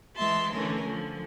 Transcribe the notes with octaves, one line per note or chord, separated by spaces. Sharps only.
E3 G#3 E5 A5 C6
D3 E3 A3 C#4 A#4
D3 F3